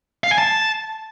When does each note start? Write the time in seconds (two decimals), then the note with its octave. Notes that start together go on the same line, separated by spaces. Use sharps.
0.24 F5
0.31 G#5
0.38 A5